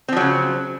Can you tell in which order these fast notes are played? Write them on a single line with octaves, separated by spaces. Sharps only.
C4 F3 F#3 C#3